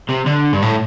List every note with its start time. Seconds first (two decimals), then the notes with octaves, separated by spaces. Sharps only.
0.09 C3
0.27 D3
0.53 G2
0.62 A2